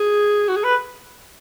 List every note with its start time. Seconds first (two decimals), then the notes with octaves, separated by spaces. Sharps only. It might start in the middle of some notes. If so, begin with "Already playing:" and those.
Already playing: G#4
0.48 F#4
0.56 G#4
0.64 B4